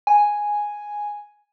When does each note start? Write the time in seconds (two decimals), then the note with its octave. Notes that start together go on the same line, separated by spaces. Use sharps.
0.07 G#5